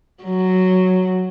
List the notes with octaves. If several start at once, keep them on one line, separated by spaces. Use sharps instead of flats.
F#3